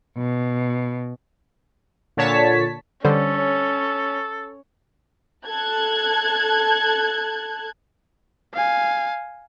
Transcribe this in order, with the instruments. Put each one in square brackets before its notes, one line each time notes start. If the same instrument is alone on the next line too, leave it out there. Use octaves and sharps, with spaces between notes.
[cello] B2
[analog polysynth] A#2 D3 C#5 A5 B6
[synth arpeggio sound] D3 G3 C5 [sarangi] C#4 [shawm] A4
[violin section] A4 A5 F#6 G#6
[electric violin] F5 G#5